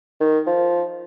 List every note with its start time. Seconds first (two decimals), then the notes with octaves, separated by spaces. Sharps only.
0.21 D#3
0.47 F3